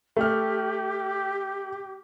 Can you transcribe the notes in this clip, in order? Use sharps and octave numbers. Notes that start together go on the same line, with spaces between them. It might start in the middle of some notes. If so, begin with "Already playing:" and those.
A3 G4 F6